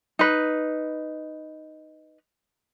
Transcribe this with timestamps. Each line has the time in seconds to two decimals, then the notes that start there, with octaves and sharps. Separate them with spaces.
0.19 D#4 B4